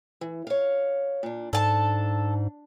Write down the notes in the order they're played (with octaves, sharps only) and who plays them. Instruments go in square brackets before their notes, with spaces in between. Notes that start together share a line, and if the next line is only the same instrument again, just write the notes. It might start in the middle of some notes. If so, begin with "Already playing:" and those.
[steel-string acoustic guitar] E3
C#5 F5
A#2 D4
[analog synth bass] G#2 [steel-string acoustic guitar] D4 [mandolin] A4 A5